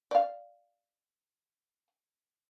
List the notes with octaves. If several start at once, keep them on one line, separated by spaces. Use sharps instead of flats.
D5 F5